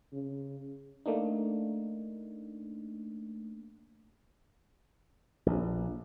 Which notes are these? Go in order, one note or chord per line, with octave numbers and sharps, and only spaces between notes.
C#3
A3 A#3 D4 D#4
A#1